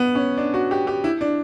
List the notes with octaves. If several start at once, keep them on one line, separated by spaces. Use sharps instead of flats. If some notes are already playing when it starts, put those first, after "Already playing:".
Already playing: B3
C#4
D4
F#4
G4
G4
E4
D4